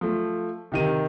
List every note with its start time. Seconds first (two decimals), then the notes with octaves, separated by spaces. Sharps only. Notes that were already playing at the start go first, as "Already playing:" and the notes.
0.01 F3 A3
0.72 C3 D#3 D#7